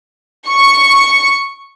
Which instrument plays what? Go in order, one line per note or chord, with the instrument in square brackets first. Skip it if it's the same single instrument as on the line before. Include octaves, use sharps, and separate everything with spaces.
[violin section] C#6